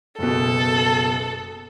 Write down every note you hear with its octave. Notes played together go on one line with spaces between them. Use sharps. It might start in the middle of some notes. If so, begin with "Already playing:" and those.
F#1 B2 A4